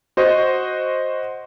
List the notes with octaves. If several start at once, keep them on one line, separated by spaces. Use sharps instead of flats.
F#4 C5 D#5 C#6